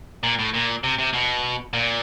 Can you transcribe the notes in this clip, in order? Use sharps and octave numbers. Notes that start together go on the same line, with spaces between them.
A#2
A2
A#2
C3
C3
B2
A#2